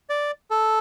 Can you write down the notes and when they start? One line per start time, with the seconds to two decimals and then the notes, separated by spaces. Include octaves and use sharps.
0.10 D5
0.51 A4